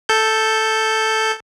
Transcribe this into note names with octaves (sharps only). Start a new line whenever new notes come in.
A4 G6